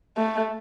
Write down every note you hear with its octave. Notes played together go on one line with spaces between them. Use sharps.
A3